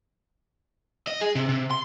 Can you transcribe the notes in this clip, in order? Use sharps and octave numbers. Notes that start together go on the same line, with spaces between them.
D#5
G#4
C3
C3
C6